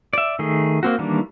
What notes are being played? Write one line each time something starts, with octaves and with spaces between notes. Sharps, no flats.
D5 E5
D#3 A3 G#4
A#3 C4 F#4
D#3 E3 G3 A#3 D4